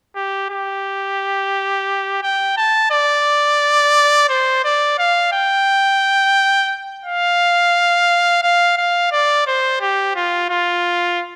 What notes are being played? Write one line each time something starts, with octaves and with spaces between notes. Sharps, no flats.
G4
G4
G5
A5
D5
C5
D5
F5
G5
F5
F5
F5
D5
C5
G4
F4
F4